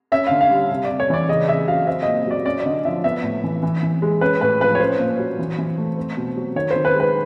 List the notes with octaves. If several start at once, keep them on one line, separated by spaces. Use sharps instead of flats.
C#4 E5
D3 F5
F5
G3
C3
D5
C3
C#5
E3 D5
C#3 D#5
C#3 E5
F#3 F5
C4 E5
A#2 D#5
F#3 D5
C#4 D5
D5
D3 D#5
F3 E5
B3 E5
A2
E3
E3
E3
G#3
C#4 B4
A2 B4
F3 B4
C#5
C#4 C5
A#2
F#3
E3
E3
A3
C4
B2
F#3
D#3 C#5
C5
D#3
B4
G#3
B4